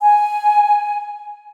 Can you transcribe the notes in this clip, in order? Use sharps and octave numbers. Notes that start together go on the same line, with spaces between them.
G#5